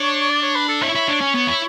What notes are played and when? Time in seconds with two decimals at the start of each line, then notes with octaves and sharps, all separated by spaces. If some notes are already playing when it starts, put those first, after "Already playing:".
Already playing: D4 C#5
0.29 D5
0.42 C#5
0.55 B4
0.69 A4
0.82 E4 C#5
0.95 E4
1.08 D4
1.21 C#4
1.34 B3
1.47 E4